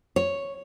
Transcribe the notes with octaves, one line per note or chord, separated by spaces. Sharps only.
C#5